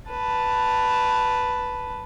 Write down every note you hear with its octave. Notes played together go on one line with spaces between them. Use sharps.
B4 A5